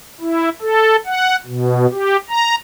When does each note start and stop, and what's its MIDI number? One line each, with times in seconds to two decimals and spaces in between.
0.21 0.49 64
0.62 0.96 69
1.06 1.36 78
1.46 1.86 47
1.91 2.17 67
2.29 2.55 82